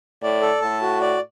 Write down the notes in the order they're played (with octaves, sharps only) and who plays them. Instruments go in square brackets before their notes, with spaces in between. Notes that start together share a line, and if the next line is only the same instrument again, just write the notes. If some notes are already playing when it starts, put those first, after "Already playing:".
[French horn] A2 [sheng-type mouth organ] D5
[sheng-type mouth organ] A4
[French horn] A2 [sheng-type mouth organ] A5
[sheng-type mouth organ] F#4
D5